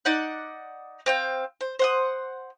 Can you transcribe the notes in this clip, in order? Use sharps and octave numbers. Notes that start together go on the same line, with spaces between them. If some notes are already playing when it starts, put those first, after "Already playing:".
D#4 D5 F#5 G6
C4 F5 G5
C5
C5 F#5 D#6